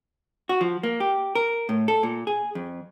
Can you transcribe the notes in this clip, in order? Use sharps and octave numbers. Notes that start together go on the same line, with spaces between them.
F#4
F3
A#3
G4
A#4
A2
A4
A#2
G#4
F2